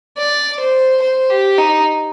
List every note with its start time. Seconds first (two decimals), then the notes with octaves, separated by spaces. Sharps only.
0.17 D5
0.60 C5
1.02 C5
1.30 G4
1.58 D#4